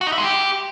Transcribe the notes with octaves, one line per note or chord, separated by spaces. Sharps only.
F#4
D#4
E4
G#3
G4